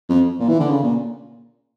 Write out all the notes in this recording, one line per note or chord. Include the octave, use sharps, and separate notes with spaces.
F2
A#2
E3
D3
C#3
A#2